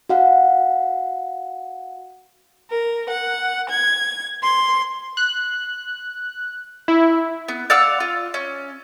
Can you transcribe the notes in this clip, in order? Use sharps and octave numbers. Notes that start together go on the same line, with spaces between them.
F#4 F5 F#5
A#4
F#5
G#6
C6
F#6
E4
B3
D5 F5 F#5 E6
F4
C#4